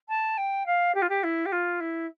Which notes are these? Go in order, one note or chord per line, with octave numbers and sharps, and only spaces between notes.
A5
G5
F5
G4
F4
G4
E4
G4
F4
E4